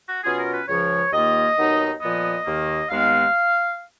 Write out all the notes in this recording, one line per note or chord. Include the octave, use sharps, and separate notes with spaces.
F#4
B2 F#3 C#4 F4 G#4
A#4
B4
C#2 C#3 F3 C#5
D#2 D#3 A#3 F4 D#5
D#2 D#3 F#3 B3 D#4
A#2 F3 B3 D#5
D#2 D#3 A#3
D#2 D#3 G#3 B3 F5